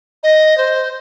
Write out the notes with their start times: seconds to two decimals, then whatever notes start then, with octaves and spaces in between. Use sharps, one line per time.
0.23 D#5
0.58 C5